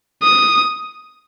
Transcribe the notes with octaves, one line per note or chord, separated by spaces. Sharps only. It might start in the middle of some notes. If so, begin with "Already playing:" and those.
D#6